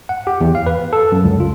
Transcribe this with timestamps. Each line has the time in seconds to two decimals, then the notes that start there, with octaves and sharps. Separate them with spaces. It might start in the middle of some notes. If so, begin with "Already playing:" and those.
0.09 F#5
0.27 G4
0.41 E2
0.55 F5
0.66 B4
0.93 A4
1.12 F#2
1.24 C#2
1.40 F4